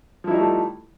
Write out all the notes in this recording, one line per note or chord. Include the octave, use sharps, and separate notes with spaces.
F3 G3 A3 D#4 E4